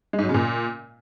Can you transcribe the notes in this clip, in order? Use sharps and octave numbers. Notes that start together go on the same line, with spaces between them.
G#3
G#2
F#3
C#3
A#2